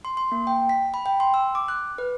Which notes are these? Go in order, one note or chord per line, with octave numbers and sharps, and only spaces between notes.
C6
C6
A#3
G5
B6
B5
G5
C6
E6
D6
F#6
B4